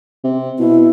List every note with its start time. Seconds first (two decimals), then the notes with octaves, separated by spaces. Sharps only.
0.24 C3
0.59 B2 E4